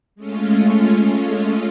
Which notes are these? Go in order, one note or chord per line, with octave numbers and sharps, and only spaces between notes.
G#3 A3 C#4 F4